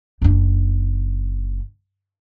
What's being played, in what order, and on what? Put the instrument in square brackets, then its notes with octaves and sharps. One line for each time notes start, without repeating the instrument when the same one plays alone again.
[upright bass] F#1 D4